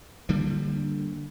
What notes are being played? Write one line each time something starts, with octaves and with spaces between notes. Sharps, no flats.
D3 G3 A#3